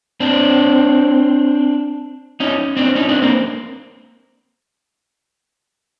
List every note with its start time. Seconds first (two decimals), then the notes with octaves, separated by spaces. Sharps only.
0.20 C4 D4
2.40 C#4 D#4
2.77 C4 D4
2.95 C#4 D#4
3.09 C4 D4
3.22 A#3 C4